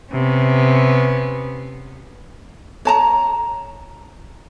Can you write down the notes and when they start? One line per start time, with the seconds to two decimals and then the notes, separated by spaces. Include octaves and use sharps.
0.12 C3 B3 C#4
2.85 C#5 A5 A#5